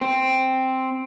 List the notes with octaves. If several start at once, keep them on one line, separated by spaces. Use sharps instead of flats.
C4